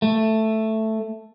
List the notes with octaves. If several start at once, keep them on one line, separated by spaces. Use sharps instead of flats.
A3